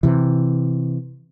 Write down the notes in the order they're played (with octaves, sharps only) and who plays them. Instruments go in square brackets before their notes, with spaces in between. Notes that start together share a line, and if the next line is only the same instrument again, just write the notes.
[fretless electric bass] C3 E3